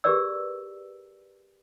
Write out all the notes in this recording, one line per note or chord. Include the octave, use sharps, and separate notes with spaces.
G4 G#4 A#4 B4 D5 E6